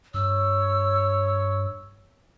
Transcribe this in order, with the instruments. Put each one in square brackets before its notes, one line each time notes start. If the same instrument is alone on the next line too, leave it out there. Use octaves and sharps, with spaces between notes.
[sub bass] G2 [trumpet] C#5 [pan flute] E6